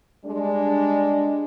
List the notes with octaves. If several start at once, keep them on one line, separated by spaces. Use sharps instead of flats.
G3 G#3 D4